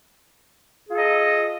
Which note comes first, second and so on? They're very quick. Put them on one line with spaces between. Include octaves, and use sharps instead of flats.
G#4 F4 A4 D#5